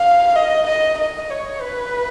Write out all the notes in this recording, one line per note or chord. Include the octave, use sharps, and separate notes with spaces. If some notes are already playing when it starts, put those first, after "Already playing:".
Already playing: F5
D#5
D#5
D#5
C#5
B4